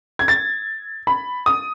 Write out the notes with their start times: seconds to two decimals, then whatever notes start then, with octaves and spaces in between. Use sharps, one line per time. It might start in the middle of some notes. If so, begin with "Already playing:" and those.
0.19 G#6
0.28 A6
1.07 B5
1.46 D#6